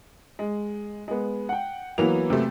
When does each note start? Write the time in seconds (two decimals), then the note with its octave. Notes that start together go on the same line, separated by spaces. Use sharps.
0.39 G#3
1.08 G#3 B3
1.49 F#5 G5
1.98 E3 F#3 A#3 B3 F7
2.30 C3 A3